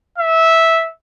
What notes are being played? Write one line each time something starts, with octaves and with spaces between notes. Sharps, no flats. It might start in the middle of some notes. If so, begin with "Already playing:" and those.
E5